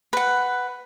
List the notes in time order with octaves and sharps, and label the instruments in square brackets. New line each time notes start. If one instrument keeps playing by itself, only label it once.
[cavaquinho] B4 F#5